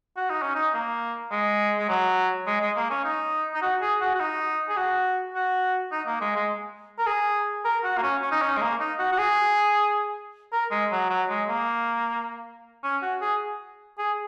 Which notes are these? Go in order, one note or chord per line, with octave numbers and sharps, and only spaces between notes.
F#4
D#4
C#4
D#4
A#3
G#3
G#3
F#3
G#3
G#3
A#3
C#4
D#4
D#4
F#4
G#4
F#4
F#4
D#4
G#4
F#4
F#4
D#4
A#3
G#3
G#3
A#4
G#4
A#4
F#4
A#3
C#4
C#4
D#4
C#4
G#3
A#3
D#4
F#4
F#4
G#4
A#4
G#3
F#3
F#3
G#3
A#3
C#4
F#4
G#4
G#4